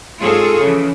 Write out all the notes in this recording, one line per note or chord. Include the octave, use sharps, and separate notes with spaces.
G#2 C4 F4 G#4 A4 C#5
C#3 E3 F3